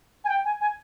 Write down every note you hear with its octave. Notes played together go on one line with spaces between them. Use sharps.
G#5
G5
G#5
G#5